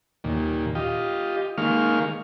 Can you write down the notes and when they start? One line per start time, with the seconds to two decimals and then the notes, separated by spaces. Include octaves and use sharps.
0.24 D#2 A#2
0.75 F4 G4 D#5
1.58 D#3 G#3 A#3 F5 C#6 F6